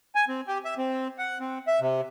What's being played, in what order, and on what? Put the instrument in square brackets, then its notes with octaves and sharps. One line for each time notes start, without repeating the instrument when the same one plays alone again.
[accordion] G#5
C4
G4
E5
C4
F#5
C4
E5
C3